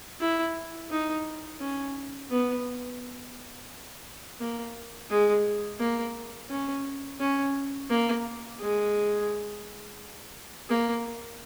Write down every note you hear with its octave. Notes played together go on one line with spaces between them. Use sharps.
E4
D#4
C#4
B3
A#3
G#3
A#3
C#4
C#4
A#3
G#3
A#3